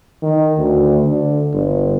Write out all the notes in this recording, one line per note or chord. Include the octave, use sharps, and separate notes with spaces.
D#3
D2
D3
G1